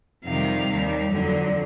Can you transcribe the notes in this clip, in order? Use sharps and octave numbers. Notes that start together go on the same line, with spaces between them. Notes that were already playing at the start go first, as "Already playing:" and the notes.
F2 C3 D#3 G3 F5
D#2 D#3 G3
F2 D3 F#3